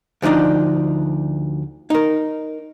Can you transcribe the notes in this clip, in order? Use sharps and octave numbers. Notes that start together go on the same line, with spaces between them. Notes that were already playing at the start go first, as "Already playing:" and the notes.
D2 F3 D4 D#4 D5
D#4 A#4